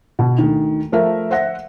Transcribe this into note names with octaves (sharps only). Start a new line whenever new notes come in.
B2
D2 D#3
F3 A3 A#4 E5
C5 E5 F#5 A#6